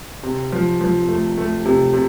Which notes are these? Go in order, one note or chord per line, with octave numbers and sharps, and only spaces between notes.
C3
F3
F3
A3
A3
C3
C3